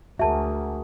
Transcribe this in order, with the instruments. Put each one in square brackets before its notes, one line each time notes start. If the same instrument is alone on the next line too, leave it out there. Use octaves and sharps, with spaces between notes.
[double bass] D2 [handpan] F#4 G#4 A#4 [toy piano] E5 A5